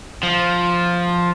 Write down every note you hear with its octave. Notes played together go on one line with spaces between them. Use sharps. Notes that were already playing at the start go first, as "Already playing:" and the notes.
F3